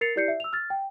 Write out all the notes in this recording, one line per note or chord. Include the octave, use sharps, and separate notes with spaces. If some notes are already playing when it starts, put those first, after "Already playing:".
A#4 A6 C7 C#7 F7
E4 G4 D5 G6 C7 C#7
E5
E6 F7
F6 A6
G5